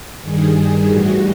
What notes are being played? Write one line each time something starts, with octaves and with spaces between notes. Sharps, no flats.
G2 D#3 G3 G#4
A2 E3 G3 F#4